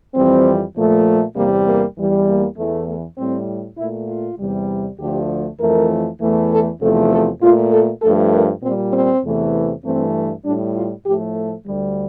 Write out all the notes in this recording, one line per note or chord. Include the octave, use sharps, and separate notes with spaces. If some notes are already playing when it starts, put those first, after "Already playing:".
F2 E3 G3 C4
A#2 F3 A3
E2 C3 G3 A#3
A#3
E2 E3 G3
A#3
E2 E3 A3
A3
A2 G3 C4
A#2 A3 E4
F4
E2 C3 G3
D2 D3 F3 A3 G4
F2 E3 A3 A#4
E2 E3 A3
A4
E2 C3 F3 A3 A4
A4
A#2 A3 F4
A4
G2 F3 A3 A4
A#4
A#2 G3 C4
C4
E2 C3 E3 A3
G2 E3 A3 C4
A2 G3 D4
F4
A2 F3 A3 G4
A4
D2 D3 G3